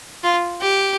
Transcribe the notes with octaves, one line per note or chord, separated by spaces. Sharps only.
F4
G4